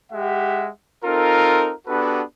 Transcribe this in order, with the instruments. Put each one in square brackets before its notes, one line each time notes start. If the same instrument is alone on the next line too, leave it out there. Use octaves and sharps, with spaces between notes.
[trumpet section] G#3 G4 E5 F#5
C4 D#4 F4 A4 A#4
B3 D4 F#4 G4 A4 B4